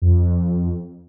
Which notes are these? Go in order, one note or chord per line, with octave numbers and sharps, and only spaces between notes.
F2